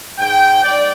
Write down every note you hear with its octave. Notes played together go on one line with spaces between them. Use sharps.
G#2 G5
D5